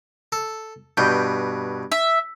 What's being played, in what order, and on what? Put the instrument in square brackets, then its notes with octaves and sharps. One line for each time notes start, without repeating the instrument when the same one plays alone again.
[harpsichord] A4
[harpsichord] G2 B2 [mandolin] G6
[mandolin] E5